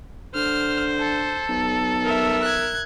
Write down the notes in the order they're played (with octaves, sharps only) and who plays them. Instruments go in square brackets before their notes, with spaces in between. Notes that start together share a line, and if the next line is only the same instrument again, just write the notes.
[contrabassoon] D3 [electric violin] C5 [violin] F6
[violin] A4
[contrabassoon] B1
[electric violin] A#4 E5
[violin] F#6 G#6